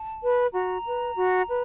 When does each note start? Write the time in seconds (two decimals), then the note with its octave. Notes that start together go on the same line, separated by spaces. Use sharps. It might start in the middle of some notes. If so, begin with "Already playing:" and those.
Already playing: A5
0.23 B4
0.54 F#4 A#5
0.85 B4
1.16 F#4
1.48 B4